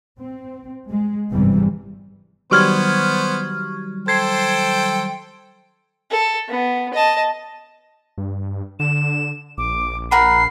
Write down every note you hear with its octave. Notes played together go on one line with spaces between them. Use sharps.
C4
G#3
G#1 E2 G2 C3 E3 G3
D#3 F#3 G3 B3 C5 C#6 F6 G#6
A4 C5 G5 G#6 C7
A4
B3
D#5 A5
G2
D3 E7
A#1 D6
A#4 F#5 B5 C7